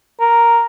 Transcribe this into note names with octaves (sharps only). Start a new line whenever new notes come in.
A#4